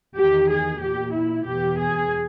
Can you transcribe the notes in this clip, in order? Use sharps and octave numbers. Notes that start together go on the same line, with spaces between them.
E2 D#3 G4
G#4
A#2 G4
E4
E2 B2 G4
G#4